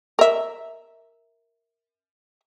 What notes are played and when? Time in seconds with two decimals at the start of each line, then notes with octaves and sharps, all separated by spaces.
0.19 A#4 E5